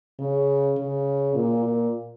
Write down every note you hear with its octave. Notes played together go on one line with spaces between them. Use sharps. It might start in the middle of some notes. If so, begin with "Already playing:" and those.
C#3
C#3
A#2
A#2